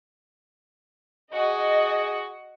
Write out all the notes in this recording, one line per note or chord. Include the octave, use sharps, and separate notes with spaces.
F#4 G#4 D#5